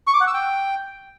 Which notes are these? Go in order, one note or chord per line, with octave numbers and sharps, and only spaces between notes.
C#6
D6
F#5
E6
G5